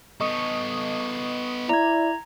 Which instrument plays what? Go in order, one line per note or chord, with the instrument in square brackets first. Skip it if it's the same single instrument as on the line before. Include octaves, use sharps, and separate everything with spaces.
[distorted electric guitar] B3 A4 [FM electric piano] D#5 C#6 D#6
[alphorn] E4 [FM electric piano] D5 [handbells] A#5 G#6